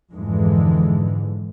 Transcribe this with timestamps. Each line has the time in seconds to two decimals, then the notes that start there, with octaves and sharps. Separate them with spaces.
0.13 F2 G#2 D3 E3 G#3